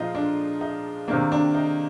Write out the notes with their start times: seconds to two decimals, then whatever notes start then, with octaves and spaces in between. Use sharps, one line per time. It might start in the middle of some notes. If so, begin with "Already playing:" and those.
Already playing: A#2 F3 G#3 D#4 F4
0.15 D4
0.61 D#4
1.08 C3 D#3 A#3 D4
1.32 D4
1.55 D#4